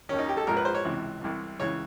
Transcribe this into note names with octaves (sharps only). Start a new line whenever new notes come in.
D#2 D#3 C#4
D#4
G4
A4
A#1 G#2 F3 A#4
B4
C5
C#5
C#2 C3 E3
C2 C3 E3
C#2 C#3 E3 C#5